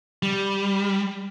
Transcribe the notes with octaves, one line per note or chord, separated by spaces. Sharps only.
G3